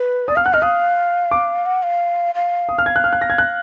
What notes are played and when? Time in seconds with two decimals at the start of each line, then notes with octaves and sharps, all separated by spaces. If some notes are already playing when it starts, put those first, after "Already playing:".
Already playing: B4
0.28 D5 D#6
0.36 F5 F6
0.45 F#5 F#6
0.54 D#5 F6
0.62 F5 D#6
1.31 D6
1.66 F#5
1.83 F5
2.35 F5
2.69 D#6
2.78 F6
2.86 G#6
2.96 F#6
3.04 F6
3.12 F#6
3.21 A#6
3.30 G#6
3.38 F#6